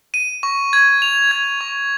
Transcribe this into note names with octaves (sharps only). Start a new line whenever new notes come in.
D#7
C#6
G#6
F7
G#6
C#6